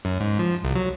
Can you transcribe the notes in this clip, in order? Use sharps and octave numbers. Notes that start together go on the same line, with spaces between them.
F#2
G#2
F3
C2
F#3